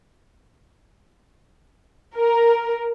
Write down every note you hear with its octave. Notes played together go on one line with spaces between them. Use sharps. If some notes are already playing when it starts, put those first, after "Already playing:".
A#4